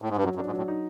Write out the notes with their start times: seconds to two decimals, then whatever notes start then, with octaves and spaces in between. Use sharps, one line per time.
0.02 A2
0.09 G#2
0.17 G2
0.23 F#2 F#3
0.35 F#2
0.38 D4
0.46 G#2
0.53 A2 F#3
0.68 D#4